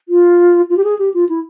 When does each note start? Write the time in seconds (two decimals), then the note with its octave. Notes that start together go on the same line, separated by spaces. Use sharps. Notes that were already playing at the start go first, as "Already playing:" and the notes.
0.09 F4
0.70 F4
0.77 G4
0.84 G#4
0.99 G4
1.14 F4
1.29 E4